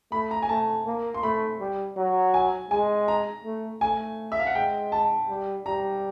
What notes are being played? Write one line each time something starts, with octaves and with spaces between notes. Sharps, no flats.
A3 B5
A#5
G#5
A3 A5
A#3
C6
A3 B5
G3
F#3
G#5
G#3 G#5
A#5
A3
A3 G#5
E5
F5
F#5
G#3 G5
A5
G3
G3 A#5